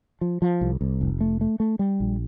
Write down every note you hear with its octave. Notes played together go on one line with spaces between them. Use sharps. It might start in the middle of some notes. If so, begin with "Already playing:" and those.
F3
F3
C2
C2
F1
A3
A3
A3
G3
A#1